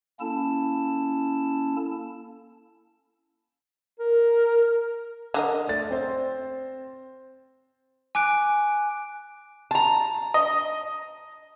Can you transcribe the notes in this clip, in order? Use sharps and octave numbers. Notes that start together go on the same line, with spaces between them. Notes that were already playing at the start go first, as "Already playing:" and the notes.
A#3 C#4 E4 A4 A5
A#4
D3 A#4 D#5
A3 D5 A6
C4 C5
G#5 D6 F#6 D7
A5 A#5
D#5